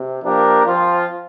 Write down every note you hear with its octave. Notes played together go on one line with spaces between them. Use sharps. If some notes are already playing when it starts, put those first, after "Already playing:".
Already playing: C3
F3 A#3 D4 G4 A#4
F3 C4 F4